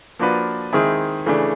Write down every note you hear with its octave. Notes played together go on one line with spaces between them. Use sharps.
F3 A#3 D4 F#4 B4
D#3 G#3 C4 E4 G#4
C#3 E3 A3 D4